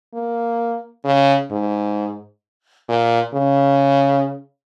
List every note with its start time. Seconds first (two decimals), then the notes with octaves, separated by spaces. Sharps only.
0.14 A#3
1.05 C#3
1.51 G#2
2.88 A#2
3.34 C#3